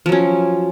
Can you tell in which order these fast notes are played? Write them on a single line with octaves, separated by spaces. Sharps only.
F3 F#3 C#4